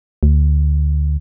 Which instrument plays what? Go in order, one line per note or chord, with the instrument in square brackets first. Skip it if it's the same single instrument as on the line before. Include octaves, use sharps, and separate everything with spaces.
[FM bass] D2